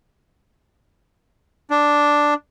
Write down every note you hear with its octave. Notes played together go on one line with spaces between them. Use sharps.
D4